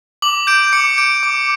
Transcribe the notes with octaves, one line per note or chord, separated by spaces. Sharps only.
D6 F#7
G6 D7
D6 C#7
G6 D7
D6